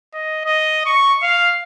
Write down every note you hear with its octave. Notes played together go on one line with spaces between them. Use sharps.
D#5
D#5
C#6
F5